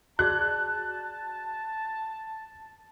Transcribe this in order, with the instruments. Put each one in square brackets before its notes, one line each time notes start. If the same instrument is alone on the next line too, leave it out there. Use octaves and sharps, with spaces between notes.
[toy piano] F#4 G#4 D5 [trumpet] A5 [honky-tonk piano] F#6